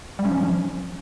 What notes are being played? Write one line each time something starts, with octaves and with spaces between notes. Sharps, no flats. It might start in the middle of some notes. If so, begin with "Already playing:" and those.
G3
C#4
F3
C#4
F3